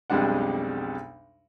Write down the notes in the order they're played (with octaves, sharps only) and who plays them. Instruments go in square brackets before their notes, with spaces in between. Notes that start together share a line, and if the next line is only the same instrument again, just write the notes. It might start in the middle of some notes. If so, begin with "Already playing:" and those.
[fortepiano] B1 F2 G3 G#3 D4 F#5